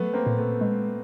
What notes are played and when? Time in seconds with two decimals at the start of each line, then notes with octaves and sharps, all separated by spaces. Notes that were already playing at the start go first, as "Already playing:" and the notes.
Already playing: F#3 A3 B3
0.14 A#3 C4
0.26 A#2
0.38 A3 B3
0.61 G#3